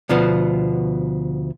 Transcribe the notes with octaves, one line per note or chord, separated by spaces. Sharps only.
D2 B2 F3 B3